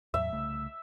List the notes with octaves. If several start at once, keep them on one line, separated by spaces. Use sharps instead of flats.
E2 A2 F#3 E5
C2 C#3 A3